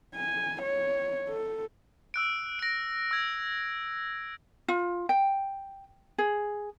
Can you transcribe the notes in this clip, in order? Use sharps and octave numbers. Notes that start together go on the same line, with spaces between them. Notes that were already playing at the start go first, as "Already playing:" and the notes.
G#5
C#5
A4
E6 F#6 D7
A#6 D7
E6 G#6
F4
G5
G#4